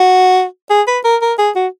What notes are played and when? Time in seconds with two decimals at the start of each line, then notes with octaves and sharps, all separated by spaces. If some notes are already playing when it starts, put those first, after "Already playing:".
Already playing: F#4
0.70 G#4
0.88 B4
1.04 A#4
1.22 A#4
1.39 G#4
1.56 F#4